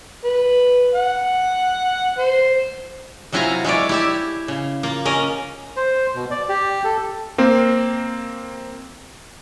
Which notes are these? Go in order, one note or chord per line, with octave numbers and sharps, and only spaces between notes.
B4
F#5
C5
C3 F#3 E4 F4 G#5 A#5
G#3 E4 C#5 D5
E4 G4 E5
C#3
A#3 F4
C#4 A#4 D#5
C5
B2
D5
G4
A4
A#3 C4